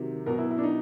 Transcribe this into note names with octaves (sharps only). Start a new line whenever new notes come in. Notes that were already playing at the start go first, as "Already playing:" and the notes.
Already playing: C3 D#3 F#3
B2 F#3 A#4
E4
E4
D4
D#4